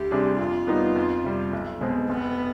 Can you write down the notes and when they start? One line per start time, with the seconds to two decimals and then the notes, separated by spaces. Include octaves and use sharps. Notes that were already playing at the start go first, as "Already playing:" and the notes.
Already playing: D2 G4
0.11 C3 G3 D4 G#4
0.38 F2 F4
0.67 D#3 G3 B3 D#4
0.96 F2
1.24 C3 G3
1.53 B1
1.81 B2 G#3 C4
2.09 F1 B3